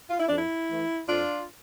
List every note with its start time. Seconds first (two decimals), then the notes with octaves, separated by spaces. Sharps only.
0.10 F4
0.19 E4
0.28 F2 D4
0.36 E4
0.70 E3 A3
1.08 F2 D4 F4